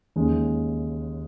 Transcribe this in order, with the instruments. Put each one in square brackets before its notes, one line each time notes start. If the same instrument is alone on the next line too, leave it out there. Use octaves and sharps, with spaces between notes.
[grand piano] D#2 C#3 G#3